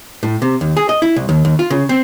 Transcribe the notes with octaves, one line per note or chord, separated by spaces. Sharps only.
A2
C3
D#2
G#4
D#5
E4
C2
D#2
D#2
F4
C#3
C4